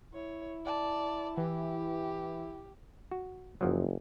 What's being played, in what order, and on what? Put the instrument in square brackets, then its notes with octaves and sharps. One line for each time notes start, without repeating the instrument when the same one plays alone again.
[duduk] E4 [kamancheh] C#5
[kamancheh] D5 A5
[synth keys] E3 [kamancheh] G4
[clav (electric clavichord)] F#4
[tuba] F#1 [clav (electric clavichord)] F#2 F3 F#3